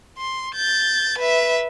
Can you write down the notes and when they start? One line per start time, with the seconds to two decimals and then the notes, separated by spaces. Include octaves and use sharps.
0.18 C6
0.55 G6 A6
1.19 B4 E5